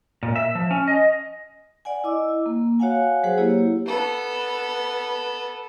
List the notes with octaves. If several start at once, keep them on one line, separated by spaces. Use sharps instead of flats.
A#2
E5
F3
C#4
D#5
D5 F#5 G#5
E4 D#5 D6 E6
A#3
F#4 C#5 F5 F#5 G#5
F#3 F#4 G#4 C5 F#5
A#3 E4 G4 C#5
B3 A4